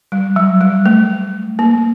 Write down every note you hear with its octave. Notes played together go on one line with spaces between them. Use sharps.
G3
F#3
G3
A3
A#3